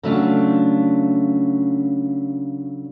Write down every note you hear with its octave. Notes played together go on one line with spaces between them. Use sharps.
C#3 F#3 A3 C#4 D4 F4